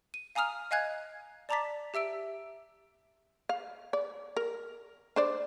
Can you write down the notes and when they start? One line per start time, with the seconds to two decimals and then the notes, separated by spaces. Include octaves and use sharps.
0.14 D#7
0.35 F5 G#5 A#5 D#6 F6 F7
0.71 D#5 F5 G#5 F#6 G#6
1.49 D5 A5 A#5 D6 A6 B6
1.94 G4 E5 E6 D7
3.49 F5
3.93 D5
4.37 A#4
5.16 D4 C5 D5